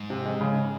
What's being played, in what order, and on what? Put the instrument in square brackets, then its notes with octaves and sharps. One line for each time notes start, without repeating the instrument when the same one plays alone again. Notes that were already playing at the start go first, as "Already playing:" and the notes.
Already playing: [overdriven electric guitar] G#2
[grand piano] C3
G#3
C#3